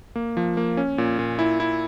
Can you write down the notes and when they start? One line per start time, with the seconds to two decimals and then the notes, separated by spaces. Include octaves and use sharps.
0.16 A#3
0.37 F3
0.57 A#3
0.77 C#4
0.98 A#2
1.19 A#2
1.39 E4
1.60 E4